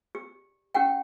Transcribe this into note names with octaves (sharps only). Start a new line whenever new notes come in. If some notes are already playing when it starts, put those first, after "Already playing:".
G4
C#4 G4 F#5 G5